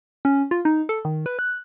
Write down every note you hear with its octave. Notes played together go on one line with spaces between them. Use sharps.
C#4
F4
D#4
A4
D#3
B4
F#6